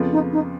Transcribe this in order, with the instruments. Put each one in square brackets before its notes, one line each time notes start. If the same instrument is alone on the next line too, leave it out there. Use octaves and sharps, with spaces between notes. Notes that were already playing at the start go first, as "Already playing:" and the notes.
Already playing: [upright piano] F2 C#3 F3 B3 F4
[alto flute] D#4
D#4